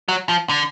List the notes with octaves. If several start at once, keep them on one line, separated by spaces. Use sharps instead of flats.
F#3
F3
D3